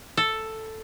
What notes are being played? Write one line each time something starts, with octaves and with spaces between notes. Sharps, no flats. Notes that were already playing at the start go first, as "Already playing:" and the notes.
A4